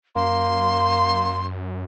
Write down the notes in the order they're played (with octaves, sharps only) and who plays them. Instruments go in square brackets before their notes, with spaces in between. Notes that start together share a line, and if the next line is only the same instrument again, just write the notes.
[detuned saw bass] F#2 [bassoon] A#3 [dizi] C6